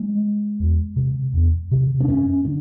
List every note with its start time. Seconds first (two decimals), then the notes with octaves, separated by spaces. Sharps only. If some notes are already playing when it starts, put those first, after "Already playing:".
Already playing: G#3
0.60 E2
0.96 C3
1.33 E2
1.71 C3
2.00 D4
2.08 F#2 C#4
2.45 D3 D4